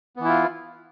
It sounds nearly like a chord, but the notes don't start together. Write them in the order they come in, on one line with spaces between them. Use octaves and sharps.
B3 E3 E4 F4